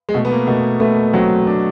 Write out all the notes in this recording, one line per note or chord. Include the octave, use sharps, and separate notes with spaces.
G#3
B2 A3
B3
A#3
B2 A3
A3 B3
F#3 C4
D4